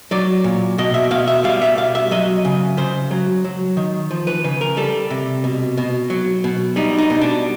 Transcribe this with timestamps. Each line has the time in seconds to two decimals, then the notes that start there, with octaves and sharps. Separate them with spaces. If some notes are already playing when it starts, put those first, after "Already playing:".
0.11 F#3 D5
0.44 A#2
0.78 B2 D#5
0.94 E5
1.11 B2 F5
1.28 E5
1.44 G3 F5
1.62 E5
1.77 B2 F5
1.95 E5
2.11 F#3 D#5
2.45 C#3
2.77 C#3 C5
3.11 F#3
3.45 F#3
3.77 D#3
4.11 F3
4.27 B4
4.44 C#3 B4
4.61 A#4
4.77 G3 A4
5.10 C3
5.44 B2
5.77 B2
6.10 F#3
6.44 B2
6.76 G3 D#4
6.98 D#4
7.10 B2
7.21 D4